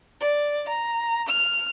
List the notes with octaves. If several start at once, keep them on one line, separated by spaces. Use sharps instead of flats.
D5
A#5
F6